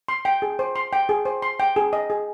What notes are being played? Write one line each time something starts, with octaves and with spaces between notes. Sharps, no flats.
C6
G5
G#4
C5
C6
G5
G#4
C5
C6
G5
G#4
D#5
G#4